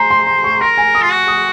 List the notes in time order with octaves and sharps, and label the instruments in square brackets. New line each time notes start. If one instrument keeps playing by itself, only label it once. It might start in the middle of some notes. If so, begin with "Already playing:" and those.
Already playing: [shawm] C5 [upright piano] G#5 A#5
[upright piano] C6
C6
C#6
[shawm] A#4 [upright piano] C6
[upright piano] G#5
D#6
[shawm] F4
F#4
[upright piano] D#6